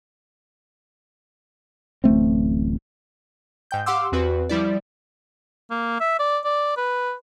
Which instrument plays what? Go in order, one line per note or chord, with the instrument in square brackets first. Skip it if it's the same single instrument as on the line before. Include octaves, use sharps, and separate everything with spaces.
[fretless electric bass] D1 A1 A3 C4
[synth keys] G#2 G5 G6
G4 F5 F#5 C6 D6 E6
E2 C4 F#4 B4
F3 G3 E4 D5
[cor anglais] A#3
E5
D5
D5
B4